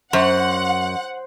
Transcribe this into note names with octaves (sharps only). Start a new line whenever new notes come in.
F#2 C5 F#5